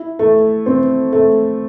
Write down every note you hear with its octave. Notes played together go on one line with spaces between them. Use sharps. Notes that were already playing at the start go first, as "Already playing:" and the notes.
Already playing: E4
A3
C4
A3